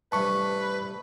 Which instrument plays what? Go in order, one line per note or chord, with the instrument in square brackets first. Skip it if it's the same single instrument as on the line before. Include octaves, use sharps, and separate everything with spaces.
[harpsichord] A1 G2 C3 [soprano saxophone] B4 [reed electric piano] A5 C#6